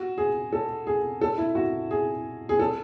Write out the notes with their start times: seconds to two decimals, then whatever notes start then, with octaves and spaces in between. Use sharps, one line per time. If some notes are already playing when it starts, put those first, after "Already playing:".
Already playing: F#4
0.18 G#4
0.53 A4
0.87 G#4
1.21 A4
1.38 E4
1.55 F#4
1.91 G#4
2.49 G#4
2.59 A4